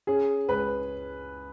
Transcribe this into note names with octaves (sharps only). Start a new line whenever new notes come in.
C#4 G#4
C#2 B4